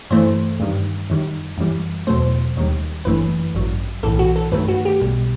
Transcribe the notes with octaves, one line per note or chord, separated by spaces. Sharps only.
G2 E3 A3 C5
G2 D#3 G3
F#2 D#3 G3
F#2 E3 G3
E2 B2 F#3 A3 C5
D#2 D#3 G3
G1 F#2 E3 A3 B4
A1 G2 F#3
B1 A2 E3 A4
F#4
A4
G2 D#3 A3 B4
F#4
G4
B1 B2 G3